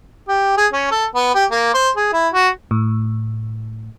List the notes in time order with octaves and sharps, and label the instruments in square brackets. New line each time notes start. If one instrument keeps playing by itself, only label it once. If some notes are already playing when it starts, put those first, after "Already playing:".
[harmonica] G4
G#4
C#4
A4
B3
G4
A#3
C5
G#4
E4
F#4
[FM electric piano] A2